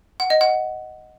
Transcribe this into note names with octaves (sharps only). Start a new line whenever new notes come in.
F#5
D#5
F#5